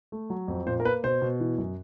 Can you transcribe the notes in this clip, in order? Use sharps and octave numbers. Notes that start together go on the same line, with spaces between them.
A3
F#3
F2
A#2 C5
A#4
A#3 B4
B2 C5
B2
E3
F#2